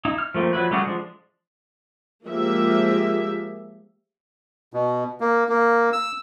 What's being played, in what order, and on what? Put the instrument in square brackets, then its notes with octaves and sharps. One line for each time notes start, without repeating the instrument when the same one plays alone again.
[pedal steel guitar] D#4 E4
F6
F3 A3 A#3 C4
F3 F#3 E4 B4
G3 A3 D4 F#4 G#4
F3 G#3 D4
[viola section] F3 G#3 A#3 G4 E5
[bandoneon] B2
A#3
A#3
E6